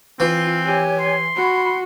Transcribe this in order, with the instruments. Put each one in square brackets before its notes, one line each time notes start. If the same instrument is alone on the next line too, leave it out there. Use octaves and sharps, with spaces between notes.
[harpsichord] E3 [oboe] C4 [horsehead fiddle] F4
[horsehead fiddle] G4 G#5 [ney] C#5
[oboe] C6
[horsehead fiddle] F#4 [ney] B5